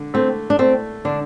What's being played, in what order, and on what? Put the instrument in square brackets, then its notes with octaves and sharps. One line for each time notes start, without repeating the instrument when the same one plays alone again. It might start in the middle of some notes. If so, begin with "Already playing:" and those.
Already playing: [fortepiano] D3
[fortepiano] A3 [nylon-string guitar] C4
[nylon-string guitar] D4
[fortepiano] A3 [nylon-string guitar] C4
[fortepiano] D3 [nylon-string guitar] D4